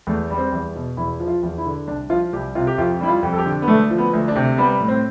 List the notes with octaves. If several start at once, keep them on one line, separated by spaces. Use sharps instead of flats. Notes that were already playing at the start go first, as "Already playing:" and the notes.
E2 A3
G3
C4
E2
B2
E2 E4
F3
F4
E2
E4
D3
C2 D4
F3 F4
C2 G4
C3 F4
G4
F2 F4
G3 E4
F4
F2
A4
G4
D3
B3
D2 A3
F3
B3
D2
D4
C3
G3 B3
A2
C4